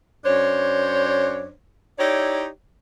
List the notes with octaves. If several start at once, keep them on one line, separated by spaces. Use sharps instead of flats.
F#2 D4 C5 C#5
D#4 E4 G4 C#5 D5